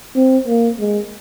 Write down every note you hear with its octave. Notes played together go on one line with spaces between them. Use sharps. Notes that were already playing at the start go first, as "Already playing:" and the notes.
C4
A#3
G#3